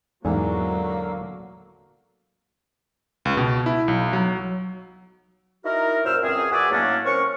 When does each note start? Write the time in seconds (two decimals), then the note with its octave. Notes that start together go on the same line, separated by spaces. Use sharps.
0.25 E2 G#2 D3 F#3 A#3 G#5
3.25 C#2
3.37 B2
3.66 E4
3.88 B1
4.13 F#3
5.65 D#4 E4 F#4 A#4
6.05 F#2 A#2 C5 E6 F6
6.22 C#2 F#2 C4 G#4
6.52 F#4 G#4 B4 D5 E5 G#5
6.71 A2 F#3 A#3 C#4 D4
7.05 C4 C#4 A#4 C#6